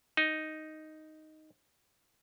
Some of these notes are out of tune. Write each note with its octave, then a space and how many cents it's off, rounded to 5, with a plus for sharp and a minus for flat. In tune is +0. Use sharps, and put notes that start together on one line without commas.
D#4 +0